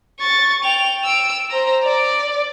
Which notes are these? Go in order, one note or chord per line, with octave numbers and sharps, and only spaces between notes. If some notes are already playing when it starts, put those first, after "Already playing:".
C#6 A6
G5 F7
E6 D7
C5 A#5
D5